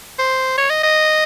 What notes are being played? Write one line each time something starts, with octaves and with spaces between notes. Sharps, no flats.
C5
C#5
D#5
D#5